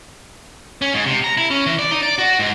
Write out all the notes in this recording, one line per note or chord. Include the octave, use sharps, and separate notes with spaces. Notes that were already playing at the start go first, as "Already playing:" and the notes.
C#4
G#2
C3
A#5
E4
C#4
E3
D5
D#4
D5
F#4
G#2